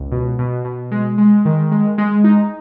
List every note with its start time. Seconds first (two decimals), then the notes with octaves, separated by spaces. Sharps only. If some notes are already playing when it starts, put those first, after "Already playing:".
Already playing: C#2
0.12 B2
0.39 B2
0.65 B2
0.91 G#3
1.18 G#3
1.45 D#3
1.71 G#3
1.98 G#3
2.24 D#4